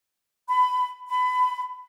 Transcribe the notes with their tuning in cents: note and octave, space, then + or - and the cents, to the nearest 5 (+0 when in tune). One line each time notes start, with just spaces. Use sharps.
B5 +20
B5 +25